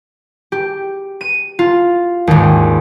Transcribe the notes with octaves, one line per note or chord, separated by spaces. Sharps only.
G4
D#7
F4
G#1 D#2